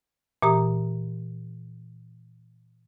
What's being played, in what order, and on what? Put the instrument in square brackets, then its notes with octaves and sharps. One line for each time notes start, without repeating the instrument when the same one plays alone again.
[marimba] A#2 E3 G4 A#5 D#6